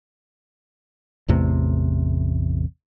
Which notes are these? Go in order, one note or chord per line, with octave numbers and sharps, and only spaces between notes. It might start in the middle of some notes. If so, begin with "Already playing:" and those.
A1 E2 C3 A3